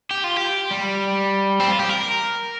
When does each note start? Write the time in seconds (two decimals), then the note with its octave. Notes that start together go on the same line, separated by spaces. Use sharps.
0.11 G4
0.24 F4
0.36 G4
0.71 G3
1.60 C4
1.70 F4
1.79 G4
1.89 A#4